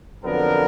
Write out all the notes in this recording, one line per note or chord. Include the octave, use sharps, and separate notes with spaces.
F2 D3 F#3 B3 A#4